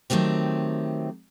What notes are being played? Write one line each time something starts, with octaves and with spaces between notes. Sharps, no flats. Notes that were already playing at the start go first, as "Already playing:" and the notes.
D#3 F#3 A3 C4 G4